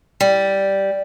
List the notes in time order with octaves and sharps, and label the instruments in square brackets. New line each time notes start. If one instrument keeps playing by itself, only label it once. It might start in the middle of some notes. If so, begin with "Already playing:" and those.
[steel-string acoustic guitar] G3